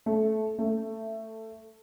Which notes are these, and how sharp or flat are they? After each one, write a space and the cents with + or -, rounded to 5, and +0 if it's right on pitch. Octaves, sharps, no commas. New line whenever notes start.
A3 -10
A3 +15